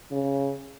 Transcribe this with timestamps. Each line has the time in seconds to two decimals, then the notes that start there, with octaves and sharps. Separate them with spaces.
0.11 C#3